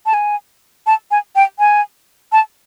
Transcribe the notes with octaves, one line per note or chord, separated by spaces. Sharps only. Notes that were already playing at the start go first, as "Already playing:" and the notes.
A5
G#5
A5
G#5
G5
G#5
A5